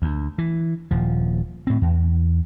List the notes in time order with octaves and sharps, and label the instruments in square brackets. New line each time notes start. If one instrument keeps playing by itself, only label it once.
[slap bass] D2
E3
D#1 F3
A2 C4
E2